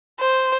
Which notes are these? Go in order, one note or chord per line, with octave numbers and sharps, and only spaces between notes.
C5